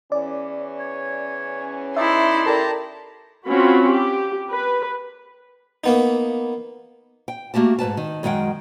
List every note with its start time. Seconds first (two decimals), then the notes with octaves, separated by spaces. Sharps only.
0.12 E2 E3 C#4 D5
0.79 C#5
1.96 D#4 E4 D5 E5 C6
2.46 G4 A4 A#4 D5 A5 A#5
3.46 C4 C#4 F4 F#4 B5
3.90 G4
4.52 B4
5.84 A#3 B3 D#4
7.28 G5
7.54 A3 A#3 F#4 G4 A5
7.79 G#2 C3 B4 A5
7.97 D#3
8.23 F#2 D#3 G#3 F#5 G5